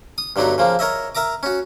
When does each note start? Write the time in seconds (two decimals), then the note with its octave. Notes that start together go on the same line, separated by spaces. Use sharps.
0.18 D#6
0.36 G2 D3 F#3 B3 D#4
0.58 C#3 F3 A#3
0.79 A#4 C#5 D#5 E5
1.15 A#4 E5 A#5 D6
1.43 C#4 F#4